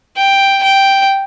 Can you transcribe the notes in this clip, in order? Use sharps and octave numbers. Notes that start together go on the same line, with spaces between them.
G5
G5